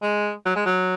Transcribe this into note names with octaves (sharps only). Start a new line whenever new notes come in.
G#3
F#3
G#3
F#3